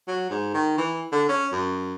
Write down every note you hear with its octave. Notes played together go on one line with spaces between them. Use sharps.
F#3
G#2
D#3
E3
D3
C#4
F#2